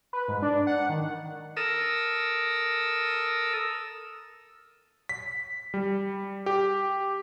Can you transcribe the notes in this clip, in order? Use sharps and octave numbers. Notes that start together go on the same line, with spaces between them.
B4
G#2
D4
F#5
D#3
A4 A#4 D#6 E6
B6
G3
G4